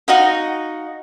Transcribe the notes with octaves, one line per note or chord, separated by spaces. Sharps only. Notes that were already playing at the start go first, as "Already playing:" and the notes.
D#4 F#4 D#5 F5